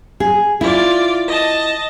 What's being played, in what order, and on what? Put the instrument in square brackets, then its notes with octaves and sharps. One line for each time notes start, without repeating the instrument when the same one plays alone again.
[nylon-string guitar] G#4
[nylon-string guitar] E4 [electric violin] F4 D5
[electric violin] D#5 A5